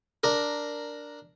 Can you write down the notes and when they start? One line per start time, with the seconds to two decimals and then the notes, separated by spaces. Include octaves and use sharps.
0.23 D4 A#4